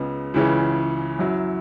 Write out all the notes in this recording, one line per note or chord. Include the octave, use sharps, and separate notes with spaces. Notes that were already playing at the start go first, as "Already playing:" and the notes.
Already playing: C#2 C#3 G#3 B3
C#2 C#3 E3 C#4
F#2 F#3 E4